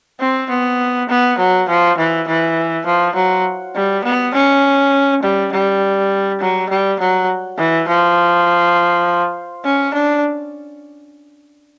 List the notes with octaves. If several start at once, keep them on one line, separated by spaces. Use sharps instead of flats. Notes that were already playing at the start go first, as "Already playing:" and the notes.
C4
B3
B3
F#3
F3
E3
E3
F3
F#3
G3
B3
C#4
G3
G3
F#3
G3
F#3
E3
F3
C#4
D4